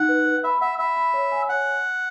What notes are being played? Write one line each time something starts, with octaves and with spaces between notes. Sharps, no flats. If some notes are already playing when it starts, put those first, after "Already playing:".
Already playing: D#4 F#5
B4
B4
E5 B5
E5 F#5
E5 B5
B5
C#5
G#5
C#5 F#5